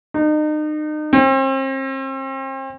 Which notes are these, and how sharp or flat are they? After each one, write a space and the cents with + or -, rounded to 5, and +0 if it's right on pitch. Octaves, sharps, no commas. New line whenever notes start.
D#4 -35
C4 +40